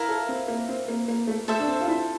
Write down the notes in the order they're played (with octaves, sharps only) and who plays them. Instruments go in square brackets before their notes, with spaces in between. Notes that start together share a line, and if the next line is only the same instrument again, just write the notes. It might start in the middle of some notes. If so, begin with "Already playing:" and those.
Already playing: [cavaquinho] E4 A#4 F5
[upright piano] A4
C4
A#3
C4
A#3
A#3
A3
[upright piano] A3 [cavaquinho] A4 C5 E5
[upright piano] D4
C4
F4
E4